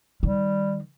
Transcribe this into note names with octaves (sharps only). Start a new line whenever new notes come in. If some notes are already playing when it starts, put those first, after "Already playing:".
D#3 G3